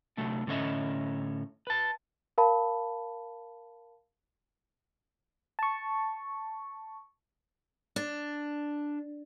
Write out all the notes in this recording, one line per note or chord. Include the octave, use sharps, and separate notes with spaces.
C3 F#3 A3 D4
A2 D3 C#4 C#5 D#5 E5
B4 A5
A#4 F5 A5 B5
A5 C#6
D4